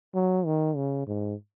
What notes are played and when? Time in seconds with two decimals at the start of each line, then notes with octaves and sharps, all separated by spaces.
0.15 F#3
0.46 D#3
0.76 C#3
1.07 G#2